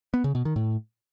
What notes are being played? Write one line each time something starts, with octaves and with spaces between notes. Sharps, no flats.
B3
C#3
B2
D#3
A2